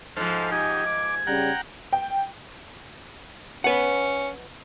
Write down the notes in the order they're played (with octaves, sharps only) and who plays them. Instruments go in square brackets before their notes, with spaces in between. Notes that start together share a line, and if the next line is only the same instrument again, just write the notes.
[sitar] G#2 F3 [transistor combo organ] A4 C5 F6
[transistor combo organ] D#4 G4 [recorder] G#6
[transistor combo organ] D6
[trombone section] C#3 G3 [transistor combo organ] F#5 G5 A#5
[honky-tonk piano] G5
[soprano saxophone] C#4 [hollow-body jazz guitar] B4 F#5